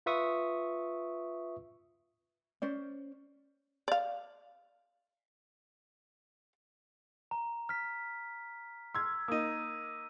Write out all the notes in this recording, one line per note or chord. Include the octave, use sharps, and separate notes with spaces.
F4 B4 E5 C#6 D#6
C#4 C5 D5
D5 F5
A#5
F6 B6
C6 E6 F6 G#6
A#3 D#4 D#6 D#7